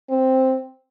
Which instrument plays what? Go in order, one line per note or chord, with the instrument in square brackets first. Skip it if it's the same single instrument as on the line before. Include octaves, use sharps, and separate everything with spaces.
[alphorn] C4